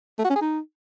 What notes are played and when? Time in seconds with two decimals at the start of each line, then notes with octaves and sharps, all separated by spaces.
0.18 A3
0.24 F#4
0.30 C#4
0.35 G#4
0.41 D#4